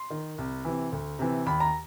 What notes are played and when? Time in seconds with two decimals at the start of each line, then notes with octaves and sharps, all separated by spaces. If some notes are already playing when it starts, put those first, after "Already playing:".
Already playing: C6
0.10 D#3
0.38 C2
0.65 C3 E3
0.92 D2
1.19 C3 E3
1.46 D#2 B5
1.60 A#5